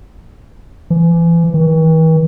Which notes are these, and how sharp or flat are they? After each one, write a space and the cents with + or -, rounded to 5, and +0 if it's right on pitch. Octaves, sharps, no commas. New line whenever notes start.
E3 +35
E3 -45